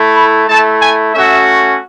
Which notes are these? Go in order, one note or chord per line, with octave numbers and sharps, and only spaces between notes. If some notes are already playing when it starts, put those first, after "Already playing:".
Already playing: A3 E4
B5
A3 E4 A5
G#5
A3 C#4 F#4 E5